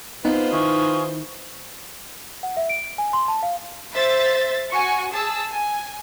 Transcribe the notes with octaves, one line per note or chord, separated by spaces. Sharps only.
B3 C4 D#4 F4 B4 C5
D#3 E4 G#5 C#6 D#6
F#5
E5
D7
G#5
C6
A5
F5
C5 E5 A6
F#4 G#5 C#6
G#4 A5 E6
G#5